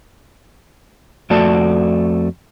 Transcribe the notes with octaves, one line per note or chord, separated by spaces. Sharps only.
F2 A3 F#4 D5 A5